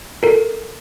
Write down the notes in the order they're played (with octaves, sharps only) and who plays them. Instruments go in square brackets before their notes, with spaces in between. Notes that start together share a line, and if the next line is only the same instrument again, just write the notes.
[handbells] A4 A#4